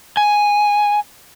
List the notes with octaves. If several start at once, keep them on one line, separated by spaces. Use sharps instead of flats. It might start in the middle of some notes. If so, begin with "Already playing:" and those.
G#5